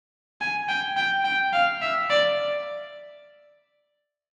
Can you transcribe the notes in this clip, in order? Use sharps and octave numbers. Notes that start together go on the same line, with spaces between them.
G#5
G5
G5
G5
F5
E5
D5